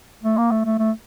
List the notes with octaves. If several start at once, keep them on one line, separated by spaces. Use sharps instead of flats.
A3
A#3
A3
A3
A3